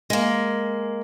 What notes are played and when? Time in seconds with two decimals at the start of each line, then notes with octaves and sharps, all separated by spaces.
0.10 G#3 A#3